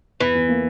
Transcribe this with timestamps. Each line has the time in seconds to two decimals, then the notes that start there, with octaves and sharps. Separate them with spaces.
0.20 E2 E3
0.35 E2
0.49 A#3